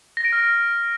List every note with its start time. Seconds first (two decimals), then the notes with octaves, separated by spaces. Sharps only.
0.17 A#6
0.25 D7
0.33 F6